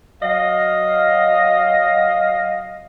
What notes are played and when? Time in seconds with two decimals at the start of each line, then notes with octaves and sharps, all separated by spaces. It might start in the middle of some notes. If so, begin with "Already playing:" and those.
0.22 F#3 D#5 F5